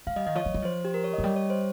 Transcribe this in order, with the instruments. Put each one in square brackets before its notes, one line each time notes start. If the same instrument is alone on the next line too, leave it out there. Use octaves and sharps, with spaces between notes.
[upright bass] G#3 [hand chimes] F5
[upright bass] G3 [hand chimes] D#5
[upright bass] D#3 [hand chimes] D#5
[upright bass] F3 [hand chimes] C#5
[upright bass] F3
G3
[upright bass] F3 [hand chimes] C5
[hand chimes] G4
A#4
C#5
D#5
[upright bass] F3
[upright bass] G3 [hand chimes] D#5
[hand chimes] C#5
C5